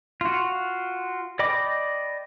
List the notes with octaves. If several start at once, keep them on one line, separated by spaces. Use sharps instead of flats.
F4 F#4
D5 D#5 G5 B5 D6